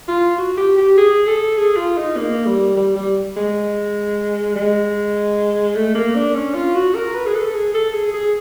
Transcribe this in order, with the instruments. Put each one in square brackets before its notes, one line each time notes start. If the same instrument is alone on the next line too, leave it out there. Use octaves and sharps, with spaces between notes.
[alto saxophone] F4
F#4
G4
G4
G#4
A4
G#4
F4
D#4
A#3
G3
G3
G3
G#3
G#3
A3
A#3
D4
C#4
F4
F#4
A#4
B4
G#4
A4
G#4
A4
G#4
G#4